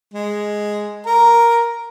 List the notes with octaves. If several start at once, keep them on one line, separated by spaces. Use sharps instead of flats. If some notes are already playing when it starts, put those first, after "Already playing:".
G#3
A#4 A#5